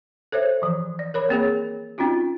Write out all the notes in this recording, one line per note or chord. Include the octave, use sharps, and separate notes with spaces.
A4 C5 C#5 E5
E3 F3
D5
A#4 C#5 B5
A#3 C4 G#4 C#5
C4 C#4 D#4 F4 F#4